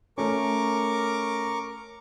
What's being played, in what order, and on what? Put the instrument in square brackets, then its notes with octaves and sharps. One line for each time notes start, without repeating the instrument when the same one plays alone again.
[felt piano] A3 C#4 [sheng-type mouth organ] A#4 C#6 D6